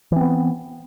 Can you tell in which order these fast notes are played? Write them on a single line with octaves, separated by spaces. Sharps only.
E3 C4 B3